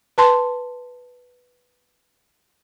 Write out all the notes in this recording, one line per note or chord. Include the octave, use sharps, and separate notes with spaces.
B4 A5 C6